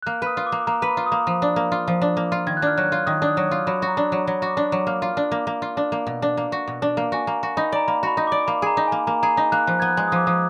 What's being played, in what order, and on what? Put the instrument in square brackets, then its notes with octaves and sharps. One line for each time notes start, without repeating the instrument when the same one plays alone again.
[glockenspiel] F#6
[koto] A#3 [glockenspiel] F6
[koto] B4 [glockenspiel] D#6
[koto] F4
[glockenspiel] D6
[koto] A#3
[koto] A#3 [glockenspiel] A#5
[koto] B4
[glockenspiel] B5
[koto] F4
[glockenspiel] D#6
[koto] A#3
F3
D4
A#3
F4
F3
D4
A#3
F4
[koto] D#3 [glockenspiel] G#6
[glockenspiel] F#6
[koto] D4 [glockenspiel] F6
[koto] F#3 [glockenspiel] F#6
[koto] F4
[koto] D#3 [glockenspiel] D#6
[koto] D4
[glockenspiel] D#6
[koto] F#3
[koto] F4 [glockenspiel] D6
[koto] F#3 [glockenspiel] B5
[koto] F#4
[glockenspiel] A#5
[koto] D4
[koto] F#3 [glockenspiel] A#5
[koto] F#3 [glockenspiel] B5
[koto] F#4 [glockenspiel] D6
[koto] D4
[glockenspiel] D6
[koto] F#3
[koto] A#3 [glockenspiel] F6
[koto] F4
D4
A#3
A#3
F4
D4
A#3
B2
D4
A#3
F#4
B2
D4
A#3
[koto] F#4 [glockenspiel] G#5
[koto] A#3 [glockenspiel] A#5
[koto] F#4
[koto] D#4 [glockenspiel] B5
[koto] D5 [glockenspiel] A#5
[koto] A#3 [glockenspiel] B5
[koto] F#4 [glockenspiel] B5
[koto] D#4
[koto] D5 [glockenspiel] D6
[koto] A#3 [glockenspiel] B5
[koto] G#4 [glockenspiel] A#5
[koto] D#4
[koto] A#3 [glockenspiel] G#5
[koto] A#3 [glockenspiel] A#5
[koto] G#4 [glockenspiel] A#5
[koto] D#4
[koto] A#3 [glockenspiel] F#6
[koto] F3 [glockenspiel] F#6
[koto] B3 [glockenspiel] G#6
[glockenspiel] F#6
[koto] G#3
[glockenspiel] D#6
[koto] F3 [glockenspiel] D6
[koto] F3 [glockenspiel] D#6